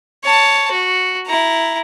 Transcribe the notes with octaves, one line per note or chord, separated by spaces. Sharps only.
C#5 A5
F#4
E4 A#5